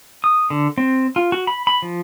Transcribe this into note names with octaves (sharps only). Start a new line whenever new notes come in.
D#6
D3
C4
F4
F#4
B5
B5
F3